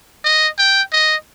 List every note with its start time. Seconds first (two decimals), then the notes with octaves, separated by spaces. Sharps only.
0.24 D#5
0.58 G5
0.92 D#5